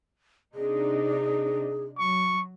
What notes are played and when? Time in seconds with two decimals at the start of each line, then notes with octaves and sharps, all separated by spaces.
0.55 C3 D4 D#4 G#4
1.98 F#3 C#6